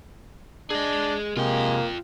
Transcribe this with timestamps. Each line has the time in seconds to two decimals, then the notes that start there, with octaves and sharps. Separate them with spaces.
0.70 D4 G#4 D#5
1.37 C3 G#3 A#3 F4 G5